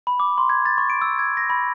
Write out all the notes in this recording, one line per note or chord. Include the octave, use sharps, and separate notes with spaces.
B5
D6
C6
G#6
A6
C#6
D7
E6
G#6
A#6
B5